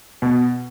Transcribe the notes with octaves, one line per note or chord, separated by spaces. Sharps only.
B2